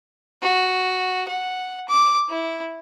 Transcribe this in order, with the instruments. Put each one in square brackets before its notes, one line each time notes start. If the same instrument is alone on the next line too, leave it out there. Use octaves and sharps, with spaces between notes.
[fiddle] F#4
F#5
D6
E4